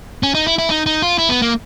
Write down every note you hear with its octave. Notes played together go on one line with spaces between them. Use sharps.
C#4
D#4
E4
E4
D#4
D#4
F4
E4
B3
A#3